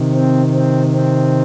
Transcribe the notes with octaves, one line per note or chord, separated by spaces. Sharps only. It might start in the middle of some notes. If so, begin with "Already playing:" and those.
Already playing: C3 D#3
C4
C4
C4